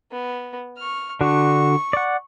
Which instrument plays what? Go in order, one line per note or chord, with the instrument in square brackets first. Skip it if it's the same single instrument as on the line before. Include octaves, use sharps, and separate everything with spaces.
[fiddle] B3
C#6 F6
[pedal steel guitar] D3 D4 F#4 [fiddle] C#6
[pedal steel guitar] D5 F#5